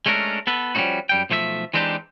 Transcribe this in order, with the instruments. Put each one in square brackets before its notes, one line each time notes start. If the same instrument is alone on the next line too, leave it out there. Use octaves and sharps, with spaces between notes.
[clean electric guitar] G#3 A3 C#4 D4 A#4
B3 A4 B4
F3 G3 A3 C#4 D#4 F#4
F#2 G3 G5
B1 F3 A3 C5 E5
E3 G#3 C4 D4 D#4 G4